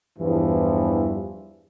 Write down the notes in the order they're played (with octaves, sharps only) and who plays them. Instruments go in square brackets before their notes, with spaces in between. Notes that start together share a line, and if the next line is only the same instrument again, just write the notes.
[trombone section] E2 G2 E3 F3